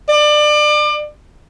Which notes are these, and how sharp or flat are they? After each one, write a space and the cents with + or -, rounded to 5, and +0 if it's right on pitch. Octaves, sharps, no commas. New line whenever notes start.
D5 +30